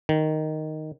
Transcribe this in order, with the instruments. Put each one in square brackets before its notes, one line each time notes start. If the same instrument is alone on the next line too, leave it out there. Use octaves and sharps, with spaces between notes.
[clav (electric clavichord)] D#3